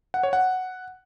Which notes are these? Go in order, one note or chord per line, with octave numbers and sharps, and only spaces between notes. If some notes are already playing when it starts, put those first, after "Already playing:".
F#5
C#5
F#5